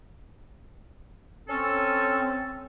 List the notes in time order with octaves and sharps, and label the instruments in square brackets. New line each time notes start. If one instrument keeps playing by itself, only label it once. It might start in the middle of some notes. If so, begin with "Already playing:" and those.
[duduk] C4 [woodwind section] C#4 A4